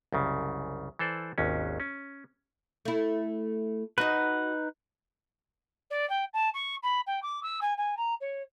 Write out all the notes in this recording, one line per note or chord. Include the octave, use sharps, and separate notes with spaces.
C2 F#2 C#3
E3 A4 C5 D5
G#1 D#2 C#4
C#4
A3 E4
D#4 F#4 B4 D#5
D5
G5
A5
C#6
B5
G5
D6
E6
G#5
G#5
A#5
C#5